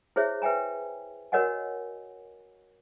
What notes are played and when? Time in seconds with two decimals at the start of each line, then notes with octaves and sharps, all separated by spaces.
0.16 E4 G#4 C5 C#5 E5
0.42 B4 E5 G5 G#5 A#5
1.32 F#4 A#4 C#5 D#5 F#5 G#5